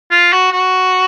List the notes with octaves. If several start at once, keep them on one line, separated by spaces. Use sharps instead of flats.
F4
F#4
F#4